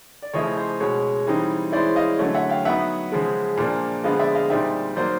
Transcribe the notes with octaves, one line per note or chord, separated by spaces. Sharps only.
D5
C#3 F3 A3 C#4 E4 C#5 D#5
C5
B2 G#3 C#4 C#5
E3 G3 C4 D#4
E3 G#3 C#4 E4 C5 D5
D#5 F5
D3 F#3 A3 C#4
E5 F#5
F5 G5
F#3 B3 D#4 E5 F#5
C#3 F3 G#3
A#2 F3 A#3 D4
D3 F3 G#3 B3 D#5 F5
D5 E5
D#5 F5
A#2 G3 C4 D#4 D5 E5
F#3 A#3 D#4 C5 D5